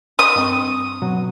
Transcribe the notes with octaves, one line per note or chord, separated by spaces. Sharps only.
D#5 D#6
G2 C4 C#6
B2 F#3